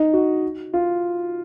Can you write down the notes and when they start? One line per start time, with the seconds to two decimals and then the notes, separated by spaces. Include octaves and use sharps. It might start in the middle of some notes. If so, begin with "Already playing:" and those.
Already playing: D#4
0.13 F#4
0.73 F4